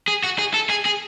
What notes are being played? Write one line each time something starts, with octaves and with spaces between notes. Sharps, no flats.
G#4
F#4
G#4
A4
G#4
G#4